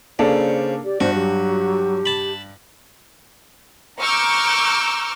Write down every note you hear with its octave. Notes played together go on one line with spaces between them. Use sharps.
C#3 A#3 D4 A4 C5 D5
G4 D5
G2 F#4 C5
F#3 G4
A5 B5
A#5 C#6 D6 E6 F6 G6